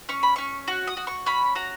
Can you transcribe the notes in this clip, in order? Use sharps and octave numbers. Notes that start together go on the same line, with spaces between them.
C#4 C#6
B5
C#4 C#6
F#4
D#6
F#4
C#6
C#4 B5
F#4 A#5